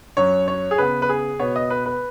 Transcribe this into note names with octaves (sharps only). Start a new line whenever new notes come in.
F#2 F#3 C#4 C#5
C#5
G#4
C#3 B3 B4
B4
G#4
B2 B3 C#5
D#5
B4
B4